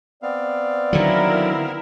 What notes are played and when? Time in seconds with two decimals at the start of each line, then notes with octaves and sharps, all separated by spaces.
0.23 B3 C4 D5 F5
0.93 D3 D#3 F#3 E4 A#4